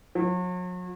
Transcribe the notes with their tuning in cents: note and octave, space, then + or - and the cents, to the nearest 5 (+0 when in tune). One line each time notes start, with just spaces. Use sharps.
F#3 -40